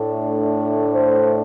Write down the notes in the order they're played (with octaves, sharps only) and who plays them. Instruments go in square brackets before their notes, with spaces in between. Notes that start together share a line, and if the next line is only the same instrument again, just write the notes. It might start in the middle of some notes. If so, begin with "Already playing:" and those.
Already playing: [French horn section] A2 A3 D4
C5